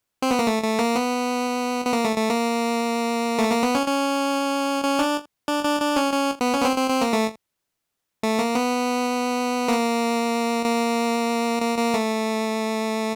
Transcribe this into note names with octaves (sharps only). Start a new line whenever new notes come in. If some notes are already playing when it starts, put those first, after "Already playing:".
C4
B3
A#3
A3
A3
A#3
B3
B3
A#3
A3
A3
A#3
A3
A#3
B3
C#4
C#4
C#4
D4
D4
D4
D4
C#4
C#4
B3
C#4
B3
C4
C4
C4
A#3
A3
A3
A#3
B3
A#3
A#3
A#3
A#3
A3